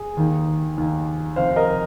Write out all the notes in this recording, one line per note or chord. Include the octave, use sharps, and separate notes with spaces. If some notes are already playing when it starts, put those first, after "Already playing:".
Already playing: G#4
D#2 D#3
D#2 D#3
F2 C3 D#3 C5 F5
A#4 D#5